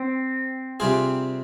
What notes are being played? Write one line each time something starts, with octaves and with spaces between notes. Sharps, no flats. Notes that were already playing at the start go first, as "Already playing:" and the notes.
Already playing: C4
C3 G3 D4 F4 G#4